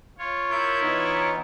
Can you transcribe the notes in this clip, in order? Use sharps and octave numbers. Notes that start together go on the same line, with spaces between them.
F4 C#5
E4 A#4 G6
E3 B3 D#4